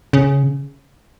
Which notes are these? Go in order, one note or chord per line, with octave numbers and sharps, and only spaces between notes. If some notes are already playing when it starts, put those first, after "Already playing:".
C#3